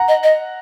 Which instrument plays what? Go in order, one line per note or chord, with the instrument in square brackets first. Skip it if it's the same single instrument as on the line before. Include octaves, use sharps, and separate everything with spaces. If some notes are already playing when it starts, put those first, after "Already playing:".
Already playing: [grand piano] F#5 A#5
[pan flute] D#5
D#5